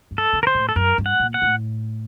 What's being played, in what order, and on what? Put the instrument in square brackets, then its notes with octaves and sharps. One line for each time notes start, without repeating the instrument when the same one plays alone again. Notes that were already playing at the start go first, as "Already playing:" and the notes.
[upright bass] G2
[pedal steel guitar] A4
[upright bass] D3
[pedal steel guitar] A#4
C5
[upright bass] A2
[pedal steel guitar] A4
[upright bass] F#2 [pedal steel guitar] A#4
[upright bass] G2
[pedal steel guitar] F#5
[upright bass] A#2
[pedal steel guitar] F#5
[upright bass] A2